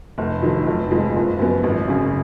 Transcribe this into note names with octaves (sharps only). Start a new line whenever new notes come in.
F1
F2 D#3 F#3
F1
F2 F3 G#3
F#1
F#2 F3 B3
G#1
F#2 C#3